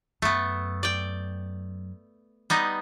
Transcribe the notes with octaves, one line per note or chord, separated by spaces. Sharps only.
F#2 A3 B3
D5 G5
G3 B3 D#4